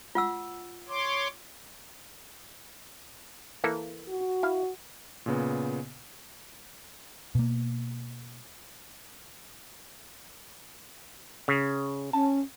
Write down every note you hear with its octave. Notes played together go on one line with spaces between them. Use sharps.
F4 F#5 E6
C#5 C6 D6
E3 A#3 A4
F#4
E4 F5
A#2 C#3 B3
B2 A#3
C#3
C#4 A5